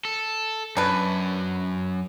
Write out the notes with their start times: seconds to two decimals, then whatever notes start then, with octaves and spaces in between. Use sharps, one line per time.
0.05 A4
0.77 F#2 D4 B4